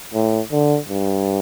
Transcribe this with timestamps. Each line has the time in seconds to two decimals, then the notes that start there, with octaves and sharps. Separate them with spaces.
0.14 A2
0.52 D3
0.88 G2